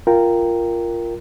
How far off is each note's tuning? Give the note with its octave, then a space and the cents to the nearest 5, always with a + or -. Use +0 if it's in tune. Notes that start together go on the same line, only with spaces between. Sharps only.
F4 -10 A#4 +0 G5 +0